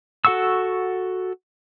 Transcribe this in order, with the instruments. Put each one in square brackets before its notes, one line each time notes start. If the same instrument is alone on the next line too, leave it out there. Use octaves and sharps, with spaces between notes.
[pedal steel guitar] F#4 A4 F#5 C#6 E6